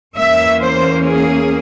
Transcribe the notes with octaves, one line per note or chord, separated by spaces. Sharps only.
E2 E3 A#3 C#4 E5
C5
G#4